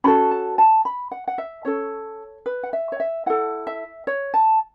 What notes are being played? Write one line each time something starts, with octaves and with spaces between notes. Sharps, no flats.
C#4 F#4 A4 B5
A5
A5
B5
F#5
F#5
E5
C#4 A4 C#5
B4
F#5
E5
C#5
E5
E4 A4 F#5
E5
C#5
A5